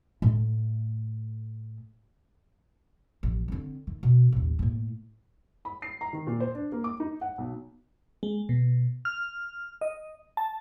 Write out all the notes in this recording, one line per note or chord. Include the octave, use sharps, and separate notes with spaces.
A2 A3
A1 F3
D3 C4
D#3
B2
A1 D#2
A2 A#3
B5
C7
A#5
D#3
A#2
C5
D4
A#3
D6
D#4
F#5
B1
G#3
B2
F6
D#5
A5